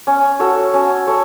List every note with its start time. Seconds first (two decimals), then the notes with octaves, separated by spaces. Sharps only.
0.07 C#4
0.40 F#4 A4 C#5
0.74 C#4
1.07 A4 C#5